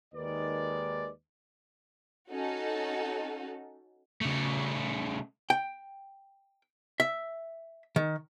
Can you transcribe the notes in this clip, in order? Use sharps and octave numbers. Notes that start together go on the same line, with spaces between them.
D#2 D#3 G#3 B4 D5
C#4 D#4 F#4 A4
C#3 A3
G5
E5
D#3